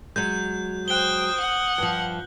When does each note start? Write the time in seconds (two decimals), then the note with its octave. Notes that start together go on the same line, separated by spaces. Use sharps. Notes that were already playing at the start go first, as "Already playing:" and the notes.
0.16 F#3 G#3 G6
0.88 C5 G5 D#6 F#6 G7
1.40 F#5
1.78 G2 F3